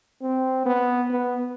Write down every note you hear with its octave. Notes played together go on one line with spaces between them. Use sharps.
C4
B3
B3